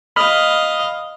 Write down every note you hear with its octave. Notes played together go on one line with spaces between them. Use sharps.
D#5 F5 B5 F6